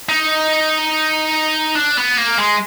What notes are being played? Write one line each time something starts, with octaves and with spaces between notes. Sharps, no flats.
D#4
D4
B3
A#3
G#3